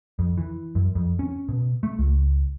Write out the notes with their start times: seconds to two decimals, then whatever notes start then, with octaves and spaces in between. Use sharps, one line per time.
0.19 F2
0.38 E3
0.75 F#2
0.95 F2
1.19 C#4
1.49 B2
1.83 A3
1.98 C#2